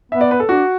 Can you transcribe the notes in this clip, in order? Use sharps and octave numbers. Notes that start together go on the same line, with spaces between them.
B3 E5
D5
B4
A4
D4 F#4